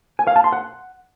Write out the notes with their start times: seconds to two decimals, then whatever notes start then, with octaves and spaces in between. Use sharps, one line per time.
0.19 G#5
0.27 F5
0.36 A5
0.44 C6
0.52 F#5